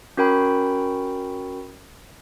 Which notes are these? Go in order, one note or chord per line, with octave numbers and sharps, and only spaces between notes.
C#4 F#4 A#4 G5 B5